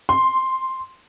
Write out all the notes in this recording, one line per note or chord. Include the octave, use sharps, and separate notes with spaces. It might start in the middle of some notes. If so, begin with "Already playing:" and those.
C6